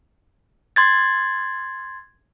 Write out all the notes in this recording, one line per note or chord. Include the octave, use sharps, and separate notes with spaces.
C6 G#6 A6